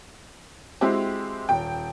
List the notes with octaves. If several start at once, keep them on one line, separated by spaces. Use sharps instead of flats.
G#3 C4 E4 F#4 G4
D#1 G5